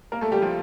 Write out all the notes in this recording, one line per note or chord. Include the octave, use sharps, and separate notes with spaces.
A#3 A#4
A3 A4
G3 G4
F3 F4